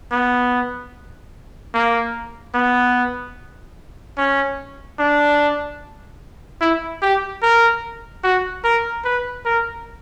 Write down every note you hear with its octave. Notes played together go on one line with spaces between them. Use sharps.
B3
A#3
B3
C#4
D4
E4
G4
A#4
F#4
A#4
B4
A#4